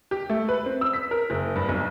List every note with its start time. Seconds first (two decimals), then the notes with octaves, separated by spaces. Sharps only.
0.11 G4
0.30 A3
0.49 B4
0.66 C4
0.81 E6
0.93 B6
1.11 A#4
1.30 F#1
1.56 G2
1.69 B1